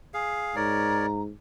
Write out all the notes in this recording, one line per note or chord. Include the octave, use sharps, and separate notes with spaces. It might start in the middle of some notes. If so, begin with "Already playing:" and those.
G#4 F5
G#2 A#4 C#5 D5 A#5